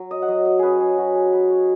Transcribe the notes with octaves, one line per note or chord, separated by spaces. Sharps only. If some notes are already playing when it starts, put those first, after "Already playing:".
Already playing: F#3
D#5
F#5
F#3 D#5
D#5
C#4 G#4 B4
G#4
F#3 F#4
G#4
G#3 B4
C#5